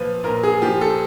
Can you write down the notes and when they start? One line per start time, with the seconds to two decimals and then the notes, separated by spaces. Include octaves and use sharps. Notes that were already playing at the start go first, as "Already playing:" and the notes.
Already playing: A#2 F3 B4
0.24 A#2 A#4
0.43 G#4
0.62 F3 G4
0.81 A4